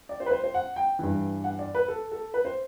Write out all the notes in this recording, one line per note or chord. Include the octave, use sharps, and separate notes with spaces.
D5
C5
B4
C5
C5
F#5
G5
G2 E3
F#5
D5
B4
A4
A4
B4
C5